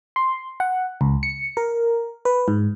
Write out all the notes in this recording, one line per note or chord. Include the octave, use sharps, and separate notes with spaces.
C6
F#5
C#2
C#7
A#4
B4
G#2